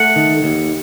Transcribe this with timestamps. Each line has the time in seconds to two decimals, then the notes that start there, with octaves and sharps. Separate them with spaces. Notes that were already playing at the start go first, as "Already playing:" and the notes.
Already playing: A3 F#5
0.16 D#3
0.44 D#2